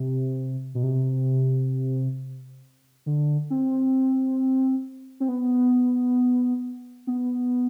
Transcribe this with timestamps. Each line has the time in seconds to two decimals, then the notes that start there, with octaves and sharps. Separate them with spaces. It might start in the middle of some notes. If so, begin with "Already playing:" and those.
Already playing: C3
0.75 B2
0.83 C3
3.06 D3
3.50 C4
5.20 C4
5.29 B3
7.07 B3